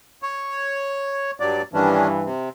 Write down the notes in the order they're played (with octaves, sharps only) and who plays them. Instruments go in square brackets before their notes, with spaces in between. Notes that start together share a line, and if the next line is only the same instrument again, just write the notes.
[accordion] C#5
G2 F#3 D5
[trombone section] G2 E3 [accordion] D#3 C#4 D4
[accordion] C3